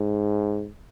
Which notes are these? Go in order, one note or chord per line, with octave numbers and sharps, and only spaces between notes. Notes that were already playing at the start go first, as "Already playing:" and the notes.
Already playing: G#2